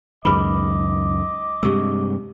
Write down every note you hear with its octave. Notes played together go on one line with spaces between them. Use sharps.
C#2 F#2 D#3 G#4 B4 D#5 B5 D6
G2 C3 G#3 G4 E6